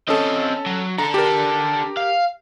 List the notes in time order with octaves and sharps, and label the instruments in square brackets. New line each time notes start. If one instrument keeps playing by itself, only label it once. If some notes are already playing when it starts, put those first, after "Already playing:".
[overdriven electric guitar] C4 D#5 [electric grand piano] C#4 A4
[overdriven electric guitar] F#3
[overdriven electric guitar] D4 A4 [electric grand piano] A#5
[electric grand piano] G4 A#4
[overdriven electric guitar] F5